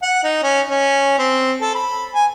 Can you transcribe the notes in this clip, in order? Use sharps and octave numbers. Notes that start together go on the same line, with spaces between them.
F#5
D#4
C#4
C#4
C4
A4
B5
G#5